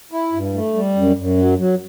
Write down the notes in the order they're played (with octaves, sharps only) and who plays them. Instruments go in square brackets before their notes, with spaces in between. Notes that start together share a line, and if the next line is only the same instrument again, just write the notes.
[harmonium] E4
G2
A3
G3
F#2
F#2
F#3
F#3